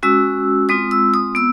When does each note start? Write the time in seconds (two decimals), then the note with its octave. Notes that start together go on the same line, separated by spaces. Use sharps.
0.03 G#3 C#4 F#4 E6
0.69 G#3 C4 F4 D#6
0.91 E6
1.14 D#6
1.35 B3 E6